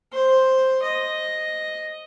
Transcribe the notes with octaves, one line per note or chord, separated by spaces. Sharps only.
C5
D#5